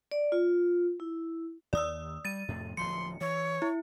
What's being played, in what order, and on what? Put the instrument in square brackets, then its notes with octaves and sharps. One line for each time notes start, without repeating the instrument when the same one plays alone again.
[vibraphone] D5
F4
E4
[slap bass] D#2 [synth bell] D5 D#6 E6
[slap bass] G3 [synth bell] A6 D#7
[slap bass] F2 A2 C3
[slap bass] D1 F3 [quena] C6 [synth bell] C#7
[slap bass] E3 [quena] C#5
[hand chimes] E4